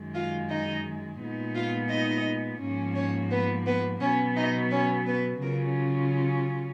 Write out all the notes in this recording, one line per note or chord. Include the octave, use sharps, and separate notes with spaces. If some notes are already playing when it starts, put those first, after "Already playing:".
Already playing: F#2 D#3 G#3
F4 F5
D#4 D#5
A#2 G#3 B3 D#4
F4 F5
D#4 D#5
G#2 F3 A#3 C#4
C#4 C#5
B3 B4
B3 B4
B2 F#3 B3 C#4 C#5
D#4 D#5
C#4 C#5
B3 B4
C#3 F#3 C#4 F4 A#4